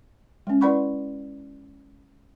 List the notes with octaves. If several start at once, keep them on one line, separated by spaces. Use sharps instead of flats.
G#3 C#4
E4 B4 D5 F#5 B5 C#6